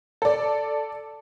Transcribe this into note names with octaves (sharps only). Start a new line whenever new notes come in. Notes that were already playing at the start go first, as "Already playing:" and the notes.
A4 D5